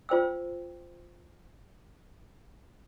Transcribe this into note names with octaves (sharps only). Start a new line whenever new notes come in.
F4 C5 G5 E6